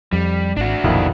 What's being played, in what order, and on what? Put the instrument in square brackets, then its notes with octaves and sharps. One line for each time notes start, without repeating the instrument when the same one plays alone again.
[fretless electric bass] F2 [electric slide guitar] G3
[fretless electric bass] G#1 [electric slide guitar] D4 F#4
[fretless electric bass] F1 B1 A#2 [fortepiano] F2 D#3 E4